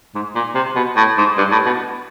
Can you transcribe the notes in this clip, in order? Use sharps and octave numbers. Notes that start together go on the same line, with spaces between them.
G#2
A#2
C3
B2
A2
G#2
G2
A2
B2